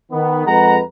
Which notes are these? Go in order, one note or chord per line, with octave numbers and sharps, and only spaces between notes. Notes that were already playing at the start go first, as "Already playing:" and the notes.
D#3 B3
F2 G#3 G#4 B4 F#5 A#5